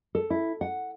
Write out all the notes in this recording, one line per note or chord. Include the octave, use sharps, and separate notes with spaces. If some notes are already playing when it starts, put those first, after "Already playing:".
A4
E4
F#5